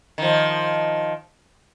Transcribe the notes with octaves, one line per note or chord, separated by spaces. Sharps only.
D#3 F3